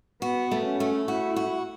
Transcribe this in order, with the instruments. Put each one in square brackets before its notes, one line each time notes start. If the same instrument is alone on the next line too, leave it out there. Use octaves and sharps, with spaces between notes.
[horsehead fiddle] B3 [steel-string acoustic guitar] F#4
[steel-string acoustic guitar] A3
[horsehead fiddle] C#4
[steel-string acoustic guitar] A3
[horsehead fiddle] E4 [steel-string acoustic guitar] F#4
[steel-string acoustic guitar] F#4